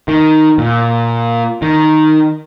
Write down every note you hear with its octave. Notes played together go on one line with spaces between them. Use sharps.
D#3
A#2
D#3